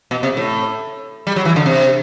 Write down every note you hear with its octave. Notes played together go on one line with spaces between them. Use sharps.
B2
C3
A2
G3
F#3
E3
D3
C3